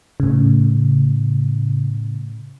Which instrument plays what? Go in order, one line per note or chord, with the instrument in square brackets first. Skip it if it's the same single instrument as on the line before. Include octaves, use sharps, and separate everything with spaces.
[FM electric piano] A2 C#3